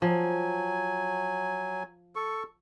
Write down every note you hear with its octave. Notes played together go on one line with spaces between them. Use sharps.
F3 F#3 G#5
A4 C#6